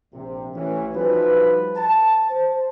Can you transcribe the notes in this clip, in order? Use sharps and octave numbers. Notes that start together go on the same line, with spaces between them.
A#1 C3
A1 E3 C#4
F3 G3 D#4 F#4 B4
A5
C5